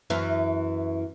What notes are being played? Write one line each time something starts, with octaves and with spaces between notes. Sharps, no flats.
F#2 E3